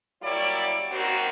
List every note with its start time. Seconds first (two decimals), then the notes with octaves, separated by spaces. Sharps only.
0.23 F#3 G3 A#3 E4 C#5 D5
0.91 F#2 D#3 A#3 C4 F#4